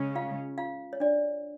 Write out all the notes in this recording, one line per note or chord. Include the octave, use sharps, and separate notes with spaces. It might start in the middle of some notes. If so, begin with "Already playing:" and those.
Already playing: C#3 G#3 C#4
F4 F5
F4 F5
C#5
D4 D5